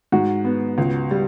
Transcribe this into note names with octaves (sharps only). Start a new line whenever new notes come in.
G#2 F#4
B3
C#2
G3